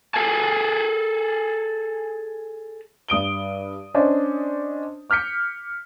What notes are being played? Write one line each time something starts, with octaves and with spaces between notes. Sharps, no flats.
G#4 A4 G#5 A5
G2 D#6 D7 G7
C#4 D4 C5 D#5 A5
D6 F6 G6 B6 C#7